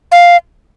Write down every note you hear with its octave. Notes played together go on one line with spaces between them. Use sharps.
F5